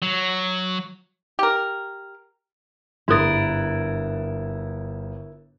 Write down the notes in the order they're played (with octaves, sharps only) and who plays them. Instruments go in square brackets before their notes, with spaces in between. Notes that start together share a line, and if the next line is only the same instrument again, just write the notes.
[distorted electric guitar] F#3
[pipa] G4 A#4
[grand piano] G1 F#6 A6 [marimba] G#2 D#6 [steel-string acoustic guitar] E4 A#4